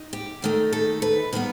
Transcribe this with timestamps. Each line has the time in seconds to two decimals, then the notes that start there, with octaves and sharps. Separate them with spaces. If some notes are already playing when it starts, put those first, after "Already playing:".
Already playing: D#4
0.13 G4
0.42 D#2 D#3 A3 D#4
0.73 A4
1.02 B4
1.33 D#3 G3 B3 B4